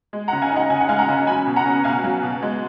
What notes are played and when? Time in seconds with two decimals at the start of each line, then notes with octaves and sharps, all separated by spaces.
0.13 G#3
0.28 F#5 A#5
0.33 C#3
0.42 F5 G#5
0.52 D#4 D#5 F#5
0.70 C#3 G#5
0.80 F#5
0.89 G#3 F5 G#5
0.98 F#5 A#5
1.09 C#3
1.27 F#3 G#5 B5
1.47 B2
1.56 F#5 A#5
1.66 C#4
1.84 B2 F5 G#5
2.04 F#3
2.23 B2
2.42 G#3